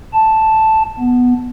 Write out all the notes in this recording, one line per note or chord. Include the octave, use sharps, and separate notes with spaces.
A5
B3